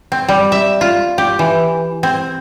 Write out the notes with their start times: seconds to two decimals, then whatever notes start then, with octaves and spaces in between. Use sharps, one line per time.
0.12 C4
0.28 G3
0.52 E5
0.81 F4
1.18 G4
1.39 E3
2.03 C4